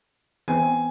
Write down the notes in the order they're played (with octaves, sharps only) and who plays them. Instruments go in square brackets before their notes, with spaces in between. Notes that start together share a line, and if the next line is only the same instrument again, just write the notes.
[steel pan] E3 B3 C4 [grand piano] G#5